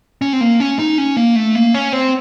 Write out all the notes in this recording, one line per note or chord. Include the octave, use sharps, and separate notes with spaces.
C#4
C4
A#3
C#4
D#4
C#4
A#3
A3
A#3
C#4
C4